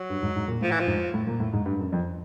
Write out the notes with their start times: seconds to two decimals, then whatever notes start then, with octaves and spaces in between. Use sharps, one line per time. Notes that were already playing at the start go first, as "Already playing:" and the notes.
Already playing: F#3
0.10 G2
0.23 G#2
0.36 G#2
0.48 A#2
0.61 A2 F3
0.71 E3
0.80 F3
0.87 G#2
1.14 A2
1.27 A#2
1.40 A2
1.53 G#2
1.66 G2
1.79 F#2
1.92 F2